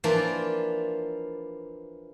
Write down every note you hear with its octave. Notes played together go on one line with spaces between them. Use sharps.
E3 F3 A#3 D4 F4 D5